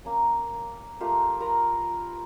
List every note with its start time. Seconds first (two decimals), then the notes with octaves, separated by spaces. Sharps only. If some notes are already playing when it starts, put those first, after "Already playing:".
0.05 A#3 C#4
1.00 A3 A#3 F4 G4
1.40 A#4 B4 A#5 C6